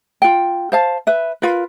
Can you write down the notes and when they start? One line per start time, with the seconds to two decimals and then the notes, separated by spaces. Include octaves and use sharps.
0.22 F4 G5
0.72 C5 F5 A5
1.07 B4 E5
1.42 F4 A#4 B4